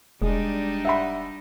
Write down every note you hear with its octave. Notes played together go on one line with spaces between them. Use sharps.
E1 G3 G#3 D4 D#4
E5 F#5 B5